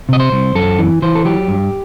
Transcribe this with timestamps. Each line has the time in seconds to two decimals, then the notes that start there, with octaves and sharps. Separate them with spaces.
0.09 C3 D#5
0.20 C5
0.32 C2
0.55 F#2 A4
0.79 E3
1.02 E3 C5
1.15 A4
1.25 F#3 G4
1.48 G2